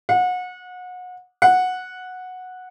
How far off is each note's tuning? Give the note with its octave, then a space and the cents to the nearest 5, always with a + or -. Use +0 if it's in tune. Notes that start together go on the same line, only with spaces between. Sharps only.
F#5 -30
F#5 -10